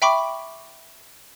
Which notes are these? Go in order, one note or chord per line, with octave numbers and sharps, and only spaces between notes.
E5 G5 B5 C#6 D6